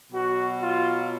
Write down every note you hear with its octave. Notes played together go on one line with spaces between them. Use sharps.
B2 F#3 F#4
F4